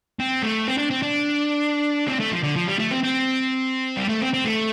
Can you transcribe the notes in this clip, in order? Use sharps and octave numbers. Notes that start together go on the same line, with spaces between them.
C4
A3
C4
D4
C4
D4
C4
A3
F3
D3
F3
G3
A3
C4
C4
G3
A3
C4
C4
A3